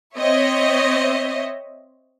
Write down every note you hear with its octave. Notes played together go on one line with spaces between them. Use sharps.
C4 C#5 D#5 E5